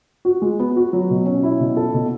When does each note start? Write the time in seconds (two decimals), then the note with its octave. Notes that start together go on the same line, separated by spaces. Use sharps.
0.25 F#4
0.42 G#3
0.59 B3
0.76 F#4
0.93 F#3
1.10 B2
1.26 C#4
1.43 E4
1.60 B2
1.77 A4
1.94 B2